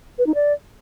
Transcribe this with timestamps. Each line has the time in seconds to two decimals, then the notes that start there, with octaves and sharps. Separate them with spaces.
0.18 B4
0.27 D#4
0.35 D5